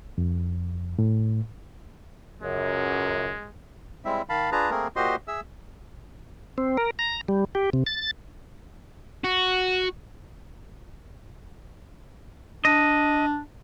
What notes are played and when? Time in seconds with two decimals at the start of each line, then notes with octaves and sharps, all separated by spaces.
0.18 F2
0.99 A2
2.42 C#2 F#2 G#3
4.05 G3 G#3 C4 E4 E5
4.29 D#3 F5 A5 B5
4.52 D4 F4 G#4 B4 A5 A#5
4.71 A3 A#3 C4 G#4 A#4
4.96 A#2 F#4 G4 C5 D#5 C6
5.28 G#4 E5 E6
6.58 C4
6.77 A#4
6.99 A#5
7.28 G3
7.55 G4
7.73 C3
7.86 A6
9.24 F#4
12.65 D4 D#5